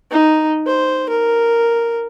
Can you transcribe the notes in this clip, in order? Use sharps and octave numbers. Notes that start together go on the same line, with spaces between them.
D#4
C5
A#4